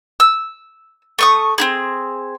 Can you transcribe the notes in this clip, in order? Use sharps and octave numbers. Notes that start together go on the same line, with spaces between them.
E6
A3 C#6 D#6
C4 E4 G#4